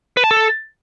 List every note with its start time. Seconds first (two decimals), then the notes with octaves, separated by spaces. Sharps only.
0.17 B4
0.24 A5
0.31 A4